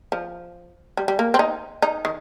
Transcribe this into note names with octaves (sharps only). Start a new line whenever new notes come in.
F3
G3
G3
A#3
C4
D#4
D#4
D#3